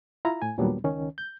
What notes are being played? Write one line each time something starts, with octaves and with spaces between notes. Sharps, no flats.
E4 F4 A#5
A2 G#5
D#2 A#2 F#3 G3 B3 D4
C#2 D#3 C#4
G6